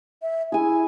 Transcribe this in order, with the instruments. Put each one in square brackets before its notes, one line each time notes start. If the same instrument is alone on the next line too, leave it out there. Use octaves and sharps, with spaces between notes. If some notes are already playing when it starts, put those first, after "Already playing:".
[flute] E5
[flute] E4 [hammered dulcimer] G#4 G#5